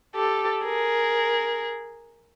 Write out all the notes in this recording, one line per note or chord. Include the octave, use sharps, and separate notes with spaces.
G4 A4
G#4 A#4